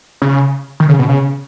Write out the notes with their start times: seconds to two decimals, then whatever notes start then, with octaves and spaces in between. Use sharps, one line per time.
0.22 C#3
0.80 D#3
0.89 C#3
0.99 B2
1.09 C#3